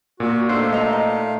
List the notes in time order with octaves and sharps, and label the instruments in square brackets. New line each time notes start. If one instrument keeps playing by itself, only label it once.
[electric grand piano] A#2 [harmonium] F#4
[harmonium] A3 D#4 F5 [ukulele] D4 A4 C5
[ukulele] D#5 A#5
D#5